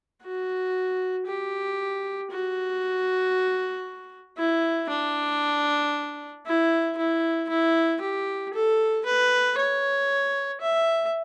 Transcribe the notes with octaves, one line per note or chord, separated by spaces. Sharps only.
F#4
G4
F#4
E4
D4
E4
E4
E4
G4
A4
B4
C#5
E5